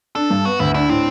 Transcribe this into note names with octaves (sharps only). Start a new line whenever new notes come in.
D4 A4
G2
B3 F#4
D2 E4
D4 E4
A2 C4